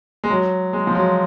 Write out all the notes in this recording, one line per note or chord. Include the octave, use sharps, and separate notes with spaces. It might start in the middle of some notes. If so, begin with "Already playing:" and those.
G#3
F#3
G#3
F3
F#3